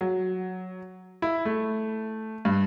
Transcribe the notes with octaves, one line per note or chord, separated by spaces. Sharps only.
F#3
E4
A3
G2